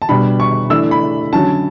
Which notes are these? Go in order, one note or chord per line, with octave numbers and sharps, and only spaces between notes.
A5
B2 G3 D4 B5
C#6
E3 A3 D4 E6
B5
D3 F#3 C#4 A5